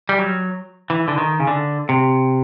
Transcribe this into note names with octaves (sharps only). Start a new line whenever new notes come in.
G3
F#3
E3
D3
D#3
C#3
D3
C3